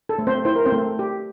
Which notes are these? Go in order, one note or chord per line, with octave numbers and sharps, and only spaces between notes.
A4
A3
C4 C5
E4 C5
A#4
C4 C5
A3
G4